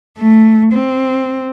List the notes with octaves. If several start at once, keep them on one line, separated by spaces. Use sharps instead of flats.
A3
C4